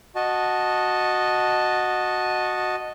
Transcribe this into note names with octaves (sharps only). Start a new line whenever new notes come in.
F#4 D#5 A5